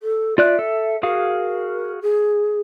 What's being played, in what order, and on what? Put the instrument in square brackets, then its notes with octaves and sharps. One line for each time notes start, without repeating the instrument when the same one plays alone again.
[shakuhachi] A4
[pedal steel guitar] F4 D5 F#6 [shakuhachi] E5
[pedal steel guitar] A4
[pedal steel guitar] F#4 G#4 F5 [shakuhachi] A#4
[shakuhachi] G#4